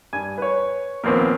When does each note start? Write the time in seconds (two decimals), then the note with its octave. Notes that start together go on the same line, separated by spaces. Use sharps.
0.13 G2 G#5
0.38 B4 C#5
1.04 D#2 A#2 F3 B3 C4 A#4